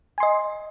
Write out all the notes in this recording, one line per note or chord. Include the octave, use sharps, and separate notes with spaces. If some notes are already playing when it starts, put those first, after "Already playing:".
D#5 G#5 C6